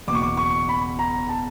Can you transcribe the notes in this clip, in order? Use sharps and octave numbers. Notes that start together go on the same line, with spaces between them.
F#1 E2 B2 D6
C#6
D6
C#6
B5
A#5
A5